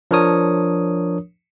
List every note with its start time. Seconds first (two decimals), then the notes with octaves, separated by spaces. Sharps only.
0.11 F3 D4 A#4 C#5 D#6